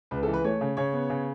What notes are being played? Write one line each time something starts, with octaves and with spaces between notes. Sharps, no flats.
C#2 B4
A4
E3
B4
A3 C#5
C#3
C#3 C#5
B3
C#3